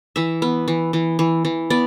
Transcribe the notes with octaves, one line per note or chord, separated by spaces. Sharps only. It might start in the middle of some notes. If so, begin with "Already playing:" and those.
E3 E5
B3
E3
E3
E3
E3
B3 D5